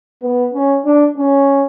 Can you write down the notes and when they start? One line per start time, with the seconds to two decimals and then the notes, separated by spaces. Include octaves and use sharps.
0.23 B3
0.54 C#4
0.85 D4
1.17 C#4